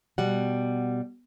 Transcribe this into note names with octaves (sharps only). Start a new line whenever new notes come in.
B2 G3 F#5